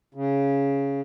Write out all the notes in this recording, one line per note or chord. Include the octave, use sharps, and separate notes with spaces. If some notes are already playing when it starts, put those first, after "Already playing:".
C#3